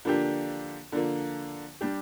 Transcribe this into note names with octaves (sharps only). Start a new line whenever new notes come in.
D3 F3 A#3 D4 G4
D3 F3 A#3
G3 D4 G4